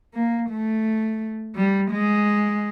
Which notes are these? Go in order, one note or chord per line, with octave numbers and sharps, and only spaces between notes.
A#3
A3
G3
G#3